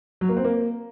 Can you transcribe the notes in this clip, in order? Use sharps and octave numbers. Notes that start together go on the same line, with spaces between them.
F#3
A#3
C4
A#3